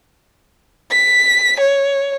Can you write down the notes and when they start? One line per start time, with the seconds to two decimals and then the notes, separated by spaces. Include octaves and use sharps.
0.91 B6
1.60 C#5